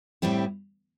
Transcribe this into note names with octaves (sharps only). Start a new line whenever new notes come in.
A2 G3 C4 E4